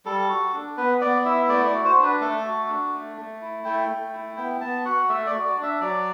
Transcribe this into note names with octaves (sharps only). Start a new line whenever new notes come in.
G3 A4
F#4
D4
B3 B4
B3 D5
E4 E5
A3 D5
D5
F#4
C5
D4
B4
A3 A4
F#4
D4
A3
A3
E4
A3 G5
A3
E4
B3 G5
B3 A5
F#4 F#5
A3 E5
D5
F#4
D5
D4
E5
F#3 D5